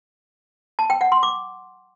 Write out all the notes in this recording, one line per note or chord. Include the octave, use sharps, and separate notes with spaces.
A5
G5
F#5
C6
D6